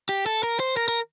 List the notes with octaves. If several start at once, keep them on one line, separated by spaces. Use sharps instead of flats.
G4
A4
A#4
C5
A#4
A#4